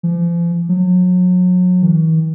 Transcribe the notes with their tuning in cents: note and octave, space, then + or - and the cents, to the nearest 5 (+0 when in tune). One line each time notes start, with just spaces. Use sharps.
F3 -40
F#3 -35
E3 -45